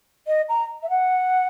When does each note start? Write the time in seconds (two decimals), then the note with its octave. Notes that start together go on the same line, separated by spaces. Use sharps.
0.27 D#5
0.49 A#5
0.83 E5
0.90 F#5